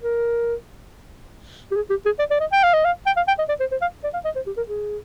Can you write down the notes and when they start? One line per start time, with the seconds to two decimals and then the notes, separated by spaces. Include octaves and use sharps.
0.03 A#4
1.71 G4
1.76 G#4
1.90 G4
2.06 G#4
2.19 D5
2.31 D5
2.40 D#5
2.52 G5
2.63 F5
2.73 D#5
2.85 F5
3.06 G5
3.16 F5
3.28 G5
3.39 D#5
3.49 D5
3.60 C5
3.71 C5
3.81 F5
4.04 D5
4.14 F5
4.25 D#5
4.36 C5
4.47 G4
4.57 A#4
4.68 G#4